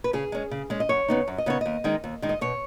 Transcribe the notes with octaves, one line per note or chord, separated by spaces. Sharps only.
B4
C#3 G#4
G#3 C#4
C#3
G#3 C#4
D#5
F#2 C#5
C#3 B3 D#4
F#2
D#5
C#3 B3 D#4 C#5
D#2 D#5
D#3 G#3 D#4
D#2
D#3 G#3 D#4
D#5
B2 C#5